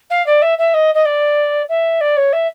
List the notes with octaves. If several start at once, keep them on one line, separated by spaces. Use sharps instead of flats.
F5
D5
E5
E5
D#5
D#5
D5
E5
D5
C#5
E5